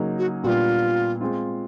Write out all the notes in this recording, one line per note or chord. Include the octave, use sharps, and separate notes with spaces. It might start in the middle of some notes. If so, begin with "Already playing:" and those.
Already playing: C#3 F#3 A#3 D#4 G#4
F#4
A#2 G3 B3 D4 F4 F#4
G#3 C4 F4